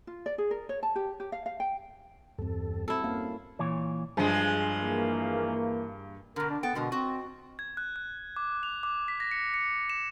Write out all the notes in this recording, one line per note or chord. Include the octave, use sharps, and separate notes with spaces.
F4
D5
G#4
A#4
C#5
A5
G4
G4
F5
F5
G5
E2 G2 G3 C4 A4
C4 E4 F#4 A4
A#3 C#4 F5
A#3
A#2 E3 C#5
G2 F3 G#3 G#4
E3 A#3
B2 D3 A#4
D4
B3 A4 G5
B2 D3 G#3 A#4
C4 F#4 D#5
G#6
F#6
F#6
D6
F7
D6
B6
A#6
C#7
C#7
E7